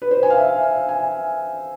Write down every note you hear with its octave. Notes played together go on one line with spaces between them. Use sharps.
B4
C5
G#5
F5
E5
F5
G#5